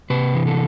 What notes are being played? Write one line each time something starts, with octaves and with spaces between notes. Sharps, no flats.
C3 B4
E3
A4